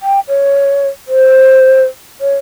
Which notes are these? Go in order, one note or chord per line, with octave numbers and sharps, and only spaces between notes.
G5
C#5
C5
C#5